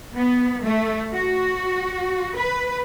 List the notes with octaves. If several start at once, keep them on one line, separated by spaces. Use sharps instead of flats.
B3
A3
F#4
B4